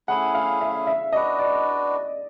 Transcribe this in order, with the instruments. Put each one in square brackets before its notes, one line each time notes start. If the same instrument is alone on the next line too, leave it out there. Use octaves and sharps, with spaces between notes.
[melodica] A3 C#4 E4 G#4 [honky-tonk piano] F#5
[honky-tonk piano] F5
E5
E5
[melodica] D4 F#4 B4 [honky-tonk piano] D#5
[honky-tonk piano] D5